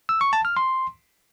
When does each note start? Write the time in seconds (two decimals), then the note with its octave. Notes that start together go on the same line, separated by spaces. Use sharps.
0.09 E6
0.21 C#6
0.33 A5
0.45 F6
0.57 C6